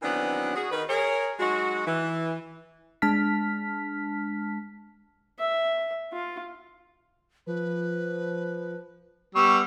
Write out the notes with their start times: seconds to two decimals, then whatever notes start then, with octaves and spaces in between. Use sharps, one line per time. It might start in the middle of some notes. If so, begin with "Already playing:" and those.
0.03 D#3 E3 F#3 B3 C4 D4
0.56 F#4 G#4
0.71 D#3 B4
0.89 G#4 A#4 C#5
1.40 F#3 G#3 D#4 F#4
1.87 E3
3.02 G#3 D4 A5 F6 B6
5.39 E5
6.13 F4
7.47 F3 B4
9.35 G3 B3 C#6 E6